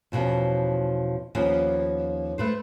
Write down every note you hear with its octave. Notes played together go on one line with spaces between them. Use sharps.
E2 B2 F3 C#4
D#2 F3 B3 C#4
A3 B4 C5